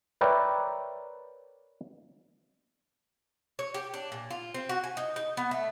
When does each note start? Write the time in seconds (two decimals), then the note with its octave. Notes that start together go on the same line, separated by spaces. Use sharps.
0.21 A#4 B4 C#5 D5 E5 G5
3.59 C#5
3.74 G4
3.94 D4
4.12 A#2
4.30 F4
4.54 C4
4.69 F#4
4.84 G#5
4.97 D#4
5.16 D#4
5.37 B3
5.51 A3